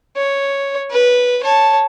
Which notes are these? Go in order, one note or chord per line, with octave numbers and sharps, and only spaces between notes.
C#5
B4
C#5 A5